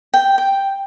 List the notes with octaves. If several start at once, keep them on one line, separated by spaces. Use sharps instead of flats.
G5
G5